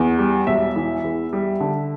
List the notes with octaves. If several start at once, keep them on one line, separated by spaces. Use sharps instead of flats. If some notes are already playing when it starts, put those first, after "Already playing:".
Already playing: E2
G3
E1 E5
E3
E2
G3
D3